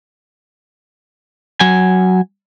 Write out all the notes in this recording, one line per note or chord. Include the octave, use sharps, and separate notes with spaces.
F#3 G#5